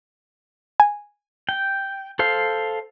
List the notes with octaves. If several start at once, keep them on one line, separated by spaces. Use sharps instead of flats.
G#5
G5
A4 C5 F5